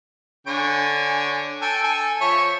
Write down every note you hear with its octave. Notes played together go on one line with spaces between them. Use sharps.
D3 C#5 G#5
A4 G5 G#5
A4 G#5
F3 C#5 E5